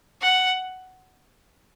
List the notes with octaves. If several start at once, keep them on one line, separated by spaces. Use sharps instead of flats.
F#5